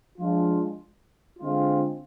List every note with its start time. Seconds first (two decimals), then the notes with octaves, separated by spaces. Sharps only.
0.18 F3 G#3 D4 F4
1.39 D3 G#3 C4 F4